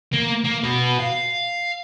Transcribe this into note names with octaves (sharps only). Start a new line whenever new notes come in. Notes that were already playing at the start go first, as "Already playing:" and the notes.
A#3
A#3
F#4 B4
F5